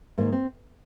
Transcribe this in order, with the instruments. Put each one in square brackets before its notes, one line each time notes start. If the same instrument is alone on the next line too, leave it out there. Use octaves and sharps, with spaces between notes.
[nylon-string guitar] G#2 D#3 A#3
C4